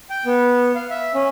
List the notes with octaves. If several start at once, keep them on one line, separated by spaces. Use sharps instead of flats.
G5
B3
F5
E5
C#4